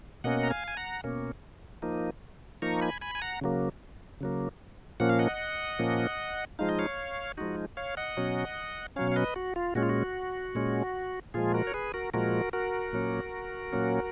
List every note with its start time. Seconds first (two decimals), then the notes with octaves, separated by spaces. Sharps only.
0.24 B2 A#3 C#4 D#5 F#5
0.43 A#5
0.50 F5 G#5
0.68 G#5
0.77 F#5 A#5
1.04 B2 A#3 C#4
1.82 F3 A#3 D#4
2.62 F3 A#3 D#4 A#5 C#6
2.82 G#5 B5
3.01 G#5 B5
3.15 G#5
3.22 F#5 A#5
3.41 C#3 F#3 A#3
4.21 C#3 F#3 A#3
5.00 A#2 F3 A#3 C#4 F#5
5.09 F5
5.19 D#5 F#5
5.79 A#2 F3 A#3 C#4
6.59 F3 G#3 D#4 F5
6.69 D#5
6.79 C#5 F5
7.38 F3 G#3 D#4 F#4
7.77 C#5 F5
7.97 D#5 F#5
8.17 B2 F#3 C#4
8.96 B2 F#3 C#4 C#5 F5
9.12 F5
9.16 B4 D#5
9.36 F#4
9.56 F4
9.75 A#2 G#3 C#4 F#4
9.83 F4
9.89 F#4
10.55 A#2 G#3 C#4
11.34 A#2 F3 G#3 F4 G#4
11.54 F#4 A#4
11.67 C#5
11.74 G#4 B4
11.94 F#4 A#4
12.14 A#2 F3 G#3 F#4 A#4
12.53 F#4 A#4
12.93 A#2 F#3 A#3 C#4
13.72 A#2 F#3 A#3 C#4